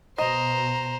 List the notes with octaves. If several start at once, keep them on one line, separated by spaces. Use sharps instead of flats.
B2 C5 D#5 A#5